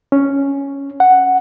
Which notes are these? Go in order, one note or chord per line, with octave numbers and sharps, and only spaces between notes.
C#4
F#5